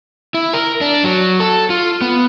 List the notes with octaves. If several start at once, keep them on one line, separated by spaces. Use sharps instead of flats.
E4
A#4
D4
F#3
A4
F4
B3